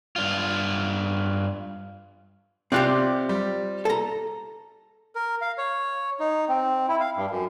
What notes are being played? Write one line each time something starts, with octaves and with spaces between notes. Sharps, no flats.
G2 F4
C3 C4 F4 G4 D5 F#6
G3
A4 A#5
A#4
F5
C#5
D#4
C4
E4
F5
G2
F#2